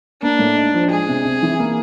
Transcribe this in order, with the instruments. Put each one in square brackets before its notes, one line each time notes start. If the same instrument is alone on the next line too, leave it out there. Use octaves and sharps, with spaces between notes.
[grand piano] A#3 [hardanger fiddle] D4
[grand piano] A2
D#4
F3
[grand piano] G#3 [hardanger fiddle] G#4
[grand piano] C3
C3
E3
A#3